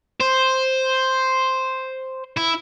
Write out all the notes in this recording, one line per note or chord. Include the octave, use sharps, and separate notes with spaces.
C5
E4